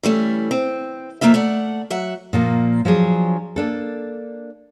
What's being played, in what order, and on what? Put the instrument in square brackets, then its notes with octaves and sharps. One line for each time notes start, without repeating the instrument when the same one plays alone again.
[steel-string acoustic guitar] E3 G3 A3 C#4
C4
F2 E3 A#3 D#4 F4 E5
A3 D5 F#5
F#3 E5 F#5
[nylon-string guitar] A#2 F3 A#3
F3 F#3 D4 G#4
A#3 D4 A4